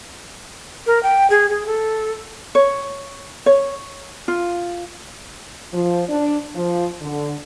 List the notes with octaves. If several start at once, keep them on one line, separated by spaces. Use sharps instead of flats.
A#4
G5
G#4
G#4
A4
C#5
C#5
F4
F3
D4
F3
D3